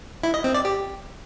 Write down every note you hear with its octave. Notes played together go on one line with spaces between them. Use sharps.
E4
D#5
C4
D5
G4